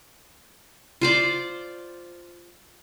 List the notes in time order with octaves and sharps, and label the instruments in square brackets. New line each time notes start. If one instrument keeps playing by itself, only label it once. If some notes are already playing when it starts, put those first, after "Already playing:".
[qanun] F4 C5 D5